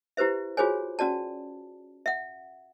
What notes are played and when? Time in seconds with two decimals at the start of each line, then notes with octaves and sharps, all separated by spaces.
0.17 E4 G4 B4 C5 E5
0.57 F4 F#4 G#4 C5 C#5 G#5
0.99 C#4 F#4 D5 A5
2.06 E5 F#5